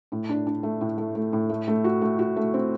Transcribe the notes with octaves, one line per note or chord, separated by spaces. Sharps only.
A2
D4
D4
A3
A2
A3
A3
A2
A3
A3
F#4
A3
F#4
A3
C4